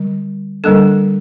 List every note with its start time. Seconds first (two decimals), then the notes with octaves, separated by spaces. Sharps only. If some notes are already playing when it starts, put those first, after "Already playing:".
Already playing: D3 G3
0.64 D3 G3 A#3 D4 A4